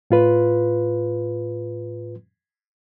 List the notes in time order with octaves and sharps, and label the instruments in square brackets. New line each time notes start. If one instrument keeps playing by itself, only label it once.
[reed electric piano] A2 F4 B4